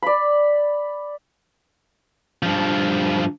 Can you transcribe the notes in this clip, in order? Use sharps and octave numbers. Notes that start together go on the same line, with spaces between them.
D5 B5
G2 F3